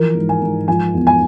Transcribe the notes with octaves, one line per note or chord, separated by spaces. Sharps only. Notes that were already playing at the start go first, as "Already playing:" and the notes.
Already playing: E3 F3 A#4
G#2
G#5
G#2
F3 G#5
E2
G#5